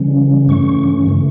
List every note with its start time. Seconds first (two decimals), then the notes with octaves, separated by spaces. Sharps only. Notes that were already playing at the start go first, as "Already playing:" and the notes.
Already playing: C#3 E3 G3 C#4
0.48 G2 E3 A3 C#4 C#6
1.08 C#3 E3 A3